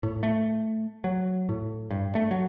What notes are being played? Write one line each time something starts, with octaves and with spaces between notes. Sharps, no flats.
A2
A3
F#3
A2
G2
A3
F#3